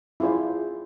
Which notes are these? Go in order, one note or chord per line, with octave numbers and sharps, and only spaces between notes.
E4 F4 G#4 C5 D5